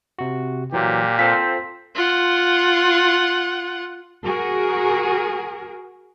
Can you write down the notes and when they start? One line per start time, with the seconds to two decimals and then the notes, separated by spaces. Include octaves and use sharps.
0.19 C3 F#4
0.73 A#2 E3 F#3 G4
1.19 C4 F4 A4 C5 B6
1.95 F4 F#5
4.25 F#4 G#4 A#4